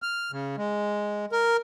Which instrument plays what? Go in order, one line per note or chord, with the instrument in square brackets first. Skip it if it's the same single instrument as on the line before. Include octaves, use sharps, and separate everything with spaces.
[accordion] F6
C#3
G#3
A#4